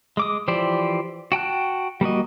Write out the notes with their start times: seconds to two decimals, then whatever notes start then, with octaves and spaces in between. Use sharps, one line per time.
0.17 G#3 D6 D#6
0.48 E3 F3 G4 C5 D5
1.32 F#4 G5 A5 F#6
2.01 G3 A#3 F#4 D#5